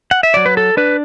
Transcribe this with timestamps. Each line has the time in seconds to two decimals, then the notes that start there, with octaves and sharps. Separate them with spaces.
0.11 F#5
0.23 E5
0.34 F#3 D5
0.46 B4
0.57 A4
0.77 D4 B4